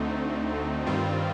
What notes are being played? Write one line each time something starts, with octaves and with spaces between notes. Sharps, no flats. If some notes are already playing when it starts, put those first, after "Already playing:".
Already playing: D2 D3 A3 C4 D#4
G2 D#3 G3 C4 F4